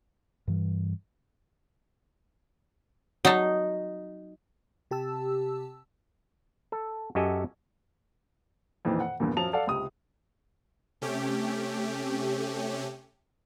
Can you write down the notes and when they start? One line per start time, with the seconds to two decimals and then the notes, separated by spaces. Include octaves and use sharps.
0.48 G2 E3 G3
3.25 F#3 D#4 A5
4.91 C3 G4 A5 E6
6.72 A4
7.15 F#2 F#4 G4 A4 D#5 G#5
8.85 F2 A#2 D#3 E3
9.00 F#5
9.20 E2 G2 A#2
9.37 F#2 F3 F#3 A5 F7
9.53 A4 D5 F5 F#5
9.67 C#2 C3 D#6
11.02 C3 A3 C#4 G4